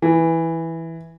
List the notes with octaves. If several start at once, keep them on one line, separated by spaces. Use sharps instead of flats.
E3